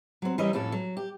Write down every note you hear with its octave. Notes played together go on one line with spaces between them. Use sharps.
F#3 C4
E3 G3 C#4 A#4 D#5
F2 A2 C#4 A4
F#3
G4